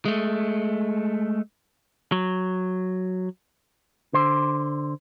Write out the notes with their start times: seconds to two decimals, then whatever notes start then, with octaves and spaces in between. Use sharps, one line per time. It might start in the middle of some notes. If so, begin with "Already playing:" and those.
0.05 G#3 A3
2.12 F#3
4.13 D3 C5